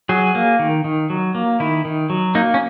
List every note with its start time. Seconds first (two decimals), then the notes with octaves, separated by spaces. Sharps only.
0.09 F#3 G#4
0.35 A#3
0.59 D#3
0.84 D#3
1.10 F#3
1.35 A#3
1.60 D#3 E4
1.85 D#3
2.10 F#3
2.35 A#3 D#4
2.54 C#4